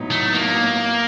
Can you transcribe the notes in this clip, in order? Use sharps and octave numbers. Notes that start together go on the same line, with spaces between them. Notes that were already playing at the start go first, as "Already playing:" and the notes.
Already playing: A2 F#3 B3 D#4
A3
A#3